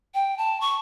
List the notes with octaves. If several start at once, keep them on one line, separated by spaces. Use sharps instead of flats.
G5
A5
C#6